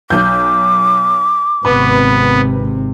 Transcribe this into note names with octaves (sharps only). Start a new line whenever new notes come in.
B1 D6 G6
G#1 C3 B3 B4